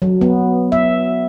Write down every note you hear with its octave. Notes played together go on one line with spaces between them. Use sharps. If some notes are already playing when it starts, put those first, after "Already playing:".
F#3
B3
E5